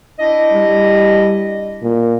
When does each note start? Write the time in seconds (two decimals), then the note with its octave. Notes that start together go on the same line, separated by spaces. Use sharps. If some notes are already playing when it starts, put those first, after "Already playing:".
0.19 D4 E4 D#5
0.53 G3
1.83 A#2